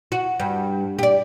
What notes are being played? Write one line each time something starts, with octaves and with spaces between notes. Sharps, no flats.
F#4
G2
G4 D5